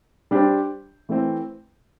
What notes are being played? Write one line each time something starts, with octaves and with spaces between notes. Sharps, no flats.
G3 D4 G4 C5
E3 A3 C4